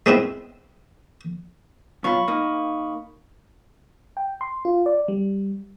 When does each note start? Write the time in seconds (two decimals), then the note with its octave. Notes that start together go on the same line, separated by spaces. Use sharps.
0.06 G#3 B3 C4 E4
2.04 B2 F#3 F4 B5 C#6
2.28 A#3 D#4
4.17 G5
4.41 C6
4.65 F4
4.86 D5
5.08 G3